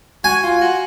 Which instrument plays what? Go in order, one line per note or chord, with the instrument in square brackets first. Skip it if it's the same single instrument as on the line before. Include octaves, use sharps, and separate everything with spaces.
[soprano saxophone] F#4 [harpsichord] G#5
[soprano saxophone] F4
F#4